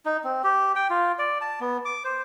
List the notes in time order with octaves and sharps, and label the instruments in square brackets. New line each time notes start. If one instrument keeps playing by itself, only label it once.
[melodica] D#4
C4
G4
G5
F4
D5
A5
B3
D6
C5